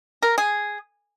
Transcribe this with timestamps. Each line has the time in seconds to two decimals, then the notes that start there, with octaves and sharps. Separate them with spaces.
0.23 A#4
0.38 G#4